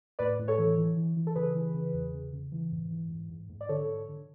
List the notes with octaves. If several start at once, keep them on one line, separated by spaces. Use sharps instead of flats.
A2 B4 D5
A2
A4 C#5
E3
E3
E3
E3
A4
C#3 G#4 B4
E3
C#3
E2
C#3
C#3
E3
G#2
E3
G#2
G#2
G#2
D5
D3 A4 C#5
D3
D3